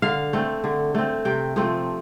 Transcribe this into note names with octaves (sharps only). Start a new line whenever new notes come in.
D3 F5
A3 C4
D3
A3 C4
C3 G5
F3 A3 C4